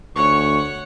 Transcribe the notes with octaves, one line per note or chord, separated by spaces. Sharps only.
D2 C#5 F#5 C#6